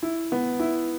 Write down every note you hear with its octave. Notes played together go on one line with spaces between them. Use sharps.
E4
B3
E4